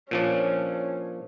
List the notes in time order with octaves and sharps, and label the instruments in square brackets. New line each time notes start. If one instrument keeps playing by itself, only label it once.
[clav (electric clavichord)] A#2 F3 D4 [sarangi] C#4